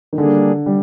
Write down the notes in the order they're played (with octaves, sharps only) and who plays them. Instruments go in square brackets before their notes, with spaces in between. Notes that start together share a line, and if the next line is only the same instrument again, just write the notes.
[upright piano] D#3
[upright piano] D3 [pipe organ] G3 A#3 D4 G#4
[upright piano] G3